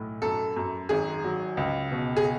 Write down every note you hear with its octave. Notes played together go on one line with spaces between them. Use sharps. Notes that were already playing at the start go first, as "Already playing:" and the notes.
Already playing: B1 A2
F#2 A4
F#2
G#1 G#4
F#3
C#2
B2
G#4